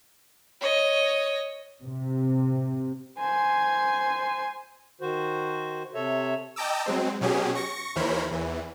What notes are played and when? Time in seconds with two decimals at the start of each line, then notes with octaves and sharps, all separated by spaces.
0.61 C#5 D#5
1.83 C3
3.20 C5 G#5
5.01 D#3 F#4 C5
5.94 C3 A4 C#5 E5
6.56 D#5 G5 A5 A#5 D6 E6
6.86 F#3 G#3 C4
7.21 B2 F#3 C#4 G4 G#4
7.55 C#6 A#6 C#7
7.96 D#2 E3 A#4 C5 C#5 B5
8.31 E2 E3